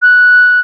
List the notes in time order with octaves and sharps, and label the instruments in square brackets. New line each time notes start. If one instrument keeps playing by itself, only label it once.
[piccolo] F#6